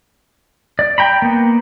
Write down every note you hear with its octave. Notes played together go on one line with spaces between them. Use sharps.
D5
G5 A#5 B5
A#3 B3